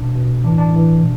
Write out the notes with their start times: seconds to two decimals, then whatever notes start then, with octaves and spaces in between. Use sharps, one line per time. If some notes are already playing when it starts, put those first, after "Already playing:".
Already playing: B2 D4
0.15 B2
0.44 A2 E3 D4
0.58 D4
0.72 A2 E3
1.01 B2